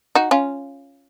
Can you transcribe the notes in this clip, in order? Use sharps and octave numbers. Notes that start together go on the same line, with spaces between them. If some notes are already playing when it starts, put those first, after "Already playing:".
D#4 F#4
C#4 F4